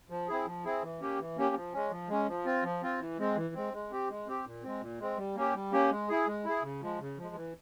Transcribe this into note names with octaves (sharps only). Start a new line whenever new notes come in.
F3
C4 E4 G#4
F3
C4 E4 G#4
E3
A#3 C#4 G4
E3
A#3 C#4 G4
F3
G#3 C#4
F3
G#3 C#4
F3
C4 F4
F3
C4 F4
E3
G#3 C4
E3
G#3 C4
G#3
C4 G4
G#3
C4 G4
A#2
G#3 C4
A#2
G#3 C4
G3
A#3 C#4 G4
G3
A#3 C#4 G4
G#3
E4 G#4
G#3
E4 G#4
C#3
F3 G#3
C#3
F3 G#3
E3